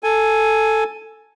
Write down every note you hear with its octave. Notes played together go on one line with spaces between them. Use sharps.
A4 G#5